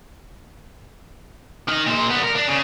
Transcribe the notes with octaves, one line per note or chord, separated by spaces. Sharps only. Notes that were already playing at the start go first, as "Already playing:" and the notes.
D#3 D#4
A#2 C5
G3 B3
A#4
D4
C#3